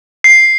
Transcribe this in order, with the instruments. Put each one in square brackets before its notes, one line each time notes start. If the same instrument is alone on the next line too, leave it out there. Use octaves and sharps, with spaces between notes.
[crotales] C7